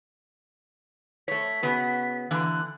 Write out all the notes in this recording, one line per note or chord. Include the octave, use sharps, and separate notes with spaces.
A3 C#5 B6
C#3 B3 F#4
D3 E3 A#3 F#6